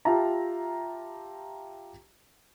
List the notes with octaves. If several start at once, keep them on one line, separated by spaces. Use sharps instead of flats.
F4 G4 E5 A5 A#5